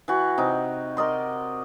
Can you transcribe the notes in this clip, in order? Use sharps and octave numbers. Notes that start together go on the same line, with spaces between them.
E3 F#4
C3 D#4
A#4 D5 D#5 C6